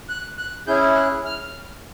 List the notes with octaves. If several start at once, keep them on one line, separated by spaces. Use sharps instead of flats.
F#6
F#6
C#4 E4 G#4 G6
F#6
F6